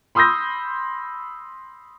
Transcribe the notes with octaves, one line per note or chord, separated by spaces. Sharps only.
B5 C6 D#6 E6 G6 A#6